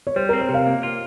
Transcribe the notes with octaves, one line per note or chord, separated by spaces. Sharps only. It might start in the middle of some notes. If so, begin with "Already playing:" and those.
C#5
G3 C5
A#4
C4
C5
C3
F5
A#3
F4